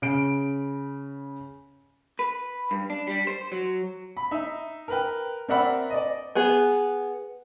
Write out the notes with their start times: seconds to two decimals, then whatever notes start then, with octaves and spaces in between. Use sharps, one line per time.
0.02 C#3 D7
2.19 B4
2.71 G2
2.90 D4
3.07 G3
3.27 C5
3.52 F#3
4.17 B5
4.31 D#4 E5
4.88 A#4 B4 G5
5.48 C4 A#4 D5 E5 F#5 B5
5.90 D5 D#5
6.35 B3 G#4